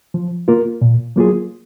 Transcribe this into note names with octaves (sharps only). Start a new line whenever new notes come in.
F3
A#3 F4 A#4
A#2
F#3 A#3 F4 G#4